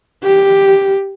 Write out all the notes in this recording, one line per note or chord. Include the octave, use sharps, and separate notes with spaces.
G4